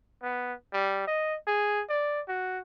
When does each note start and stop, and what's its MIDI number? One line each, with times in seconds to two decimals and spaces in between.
0.23 0.54 59
0.73 1.04 55
1.08 1.36 75
1.47 1.83 68
1.89 2.21 74
2.28 2.60 66